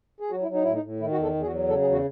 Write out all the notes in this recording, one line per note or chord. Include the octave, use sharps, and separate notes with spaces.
G#4
F#3 F#4
E4
F#3
D#4
A2 E4
D#4
A2
D#3 E4
F#4
E2
A4
E2
G#4
F#4
F#3
C#3 A4
G#4
E2
F#4